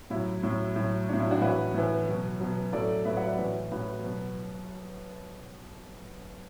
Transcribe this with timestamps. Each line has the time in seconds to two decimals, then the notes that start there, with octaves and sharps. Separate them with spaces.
0.10 A2 F#3 E4
0.43 A2 F#3
0.76 A2 F#3
1.09 A2 F#3 D4
1.20 E4
1.31 D4 F#4
1.41 A2 E3 F#4 B4
1.74 A2 E3
2.07 B2 F#3
2.40 B2 F#3
2.73 A2 F#3 A4 D5
3.05 A2 F#3 B4 E5
3.17 D5 F#5
3.28 B4 E5
3.38 A2 E3
3.71 A2 E3 F#4 B4
4.04 B2 F#3